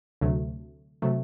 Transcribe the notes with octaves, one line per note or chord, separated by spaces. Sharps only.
D2 C3 F#3 A3
C3 F#3 A3